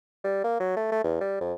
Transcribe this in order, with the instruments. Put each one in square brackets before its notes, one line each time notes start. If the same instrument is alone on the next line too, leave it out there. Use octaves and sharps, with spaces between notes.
[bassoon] G3
A#3
F#3
A3
A3
E2
G3
F2